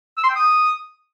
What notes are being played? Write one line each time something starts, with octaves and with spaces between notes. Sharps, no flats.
E6
C6
G5
D#6